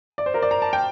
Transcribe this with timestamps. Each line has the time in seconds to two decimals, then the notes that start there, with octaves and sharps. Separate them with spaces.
0.18 D5
0.26 C5
0.34 A#4
0.42 D5
0.51 A#5
0.62 A5
0.73 G5